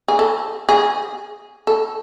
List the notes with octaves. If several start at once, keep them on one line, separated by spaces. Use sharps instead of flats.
G#4
A4
G#4
A4